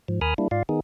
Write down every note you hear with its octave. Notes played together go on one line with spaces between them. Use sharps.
G#2 F3
D#2 A#4 G#5 B5 D#6 F6
G3 A#3 D4 E4
G#2 F4 D5 F5
D#3 B3 D#4 G#4